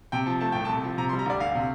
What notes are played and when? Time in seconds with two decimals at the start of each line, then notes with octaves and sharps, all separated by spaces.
0.12 C3 G5
0.26 F3 A5
0.41 A3 A5
0.52 C2 G5
0.65 C3 A5
0.84 F3
0.98 C3 A#5
1.09 C6
1.13 G3
1.19 A#5
1.26 D2 D5
1.40 D2 F5
1.55 C3